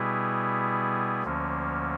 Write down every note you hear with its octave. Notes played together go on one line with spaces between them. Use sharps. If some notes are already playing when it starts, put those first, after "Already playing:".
Already playing: B2 G3 B3 E4 G#4
D2 D3 F3 A#3 C#4